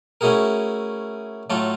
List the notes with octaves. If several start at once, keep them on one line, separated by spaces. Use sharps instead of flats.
A3 C#4 E4 F#4 G#4 A#4
A2 F#3 A3 F4 A4